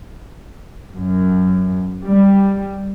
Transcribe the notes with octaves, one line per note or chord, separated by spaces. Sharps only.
F#2
G3